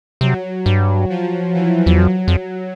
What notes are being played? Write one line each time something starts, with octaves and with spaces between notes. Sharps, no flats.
C3 F#3
G2
F3
E3
E2
F2 F#3
F2